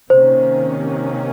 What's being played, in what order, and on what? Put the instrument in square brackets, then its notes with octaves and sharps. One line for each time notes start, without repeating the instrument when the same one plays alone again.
[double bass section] C3 D#3 A#3 C#4 [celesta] C5